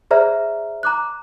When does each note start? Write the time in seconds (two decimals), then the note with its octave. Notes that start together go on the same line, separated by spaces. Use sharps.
0.11 G#4 C5 D5 E5 A#5 F6
0.83 A#5 D6 F#6